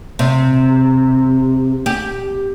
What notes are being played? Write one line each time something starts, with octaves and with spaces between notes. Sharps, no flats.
C3
G4